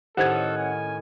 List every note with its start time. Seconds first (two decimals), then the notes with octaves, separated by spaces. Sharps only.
0.17 A2 D#3 C#4 G4 A4 C5 F#5 G#6
0.57 G#5